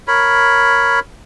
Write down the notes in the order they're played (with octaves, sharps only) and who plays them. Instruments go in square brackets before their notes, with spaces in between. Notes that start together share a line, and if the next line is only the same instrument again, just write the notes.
[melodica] A#4 C#5 B5